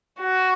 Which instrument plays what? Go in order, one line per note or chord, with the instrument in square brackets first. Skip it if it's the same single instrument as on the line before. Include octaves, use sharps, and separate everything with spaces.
[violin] F#4